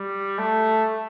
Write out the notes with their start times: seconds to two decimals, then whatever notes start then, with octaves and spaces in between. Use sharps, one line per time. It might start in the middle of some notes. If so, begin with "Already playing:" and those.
Already playing: G3
0.38 A3